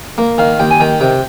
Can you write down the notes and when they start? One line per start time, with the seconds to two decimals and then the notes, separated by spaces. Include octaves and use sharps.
0.18 A#3
0.38 D#3 F5
0.60 D#2 G5
0.71 G#5
0.80 D#3 G5
1.01 C3 G5